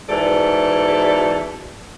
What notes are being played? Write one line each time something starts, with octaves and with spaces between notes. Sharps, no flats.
G#2 B2 E3 A4 D5